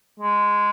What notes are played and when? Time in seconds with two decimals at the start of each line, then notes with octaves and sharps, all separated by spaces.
0.20 G#3